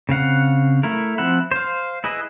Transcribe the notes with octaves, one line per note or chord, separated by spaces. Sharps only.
C#3 C4 F5 F#5
A3 E4 A#4
F3 C4 E5 F#5 B5
C5 F5
E4 G#4 B4 D#5